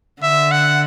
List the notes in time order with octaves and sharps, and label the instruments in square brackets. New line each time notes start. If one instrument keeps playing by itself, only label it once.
[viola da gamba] D3 [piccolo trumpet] E5
[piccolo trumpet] F#5